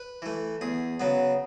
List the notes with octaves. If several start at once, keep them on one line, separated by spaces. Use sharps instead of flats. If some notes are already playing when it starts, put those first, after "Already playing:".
Already playing: B4
E3 A3
E2 G#4
C#3 F#3 B3